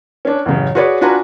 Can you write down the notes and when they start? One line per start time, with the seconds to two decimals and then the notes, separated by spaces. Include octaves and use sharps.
0.25 C#4 D4
0.46 A1 F#2 C#3
0.75 F#4 G#4 B4 C#5 D5
1.01 D4 F4 F#4 B4 G#5 A#5